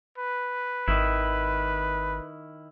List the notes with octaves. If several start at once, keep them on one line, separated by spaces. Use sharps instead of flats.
B4
G#1 D#3 E4